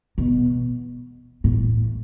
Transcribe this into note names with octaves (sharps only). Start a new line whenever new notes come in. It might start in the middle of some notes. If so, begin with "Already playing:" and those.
B2
A2